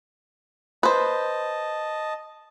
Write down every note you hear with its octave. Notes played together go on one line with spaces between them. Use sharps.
B4 C5 D#5 A5